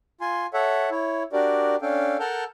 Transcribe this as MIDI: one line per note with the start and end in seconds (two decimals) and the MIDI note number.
0.21 0.46 65
0.21 0.46 80
0.21 0.46 84
0.54 0.90 69
0.54 0.90 73
0.54 0.90 76
0.54 0.90 78
0.91 1.23 64
0.91 1.23 73
1.33 1.76 62
1.33 1.76 66
1.33 1.76 67
1.33 1.76 70
1.33 1.76 74
1.82 2.17 61
1.82 2.17 62
1.82 2.17 69
1.82 2.17 77
1.82 2.17 79
2.20 2.44 69
2.20 2.44 70
2.20 2.44 78
2.20 2.44 81
2.20 2.44 89
2.20 2.44 91